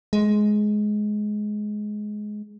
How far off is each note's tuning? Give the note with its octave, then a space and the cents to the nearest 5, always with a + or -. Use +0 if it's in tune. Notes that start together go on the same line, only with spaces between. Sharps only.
G#3 +15